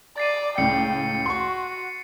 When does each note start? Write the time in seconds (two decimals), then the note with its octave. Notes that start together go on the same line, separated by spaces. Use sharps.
0.18 D5 A6 C7 D#7
0.58 C#2 A2 G5 C#7
1.26 F#4 C6 C#6